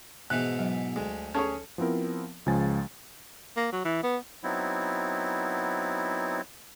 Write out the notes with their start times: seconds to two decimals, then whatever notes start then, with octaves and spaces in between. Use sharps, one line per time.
0.30 G#2 B2 E3 F#6
0.59 F#3
0.96 D2 G#3
1.35 C#4 G#4 A4 C#5 A5
1.78 F3 B3 C4 E4 A#4
2.46 C#2 C#3 F3 G#3 G#5 A6
3.57 A#3
3.73 F#3
3.85 E3
4.03 B3
4.44 F#3 B3 C4 D#4 E4